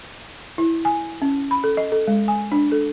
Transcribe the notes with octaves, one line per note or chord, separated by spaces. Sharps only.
E4
G#5
C#4
B5
A4
D#5
A4
G#3
G#5
D4
A4